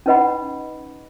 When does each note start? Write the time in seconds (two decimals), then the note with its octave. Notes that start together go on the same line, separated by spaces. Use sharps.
0.06 C#4 D#4 B4 D#5 F#5 B5